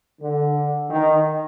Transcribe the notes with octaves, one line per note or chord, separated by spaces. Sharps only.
D3
D#3